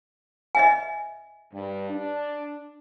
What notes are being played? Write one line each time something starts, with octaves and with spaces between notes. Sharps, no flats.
D#5 E5 G#5
G2
D4